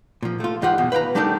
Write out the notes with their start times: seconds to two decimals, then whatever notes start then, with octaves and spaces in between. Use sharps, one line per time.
0.23 A#2 F3
0.40 A3 F4
0.62 G2 D#3 F4 G4 F#5
0.78 E2 B2
0.92 B4 F5 G5 A#5
1.15 G3 A3 D4 D#4 G4 A#4